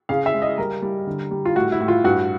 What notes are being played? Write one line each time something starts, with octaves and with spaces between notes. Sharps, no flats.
C#3 F5
E5
G#3
D#5
G3 A#4
G3
D3
G3
F4
A2 F#4
E4
A2
F4
G2 F#4